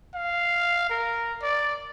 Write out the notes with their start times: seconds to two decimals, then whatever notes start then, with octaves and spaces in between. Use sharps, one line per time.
0.15 F5
0.90 A#4
1.43 D5